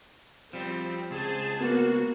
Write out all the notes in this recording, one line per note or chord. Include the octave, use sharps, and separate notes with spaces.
F3 G3 C4
C#2 G#4 C5 A5
A#3 B3 F#4